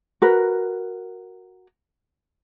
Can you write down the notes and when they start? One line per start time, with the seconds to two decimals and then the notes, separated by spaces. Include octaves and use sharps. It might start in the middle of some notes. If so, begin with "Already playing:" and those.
0.22 F#4 A#4 B4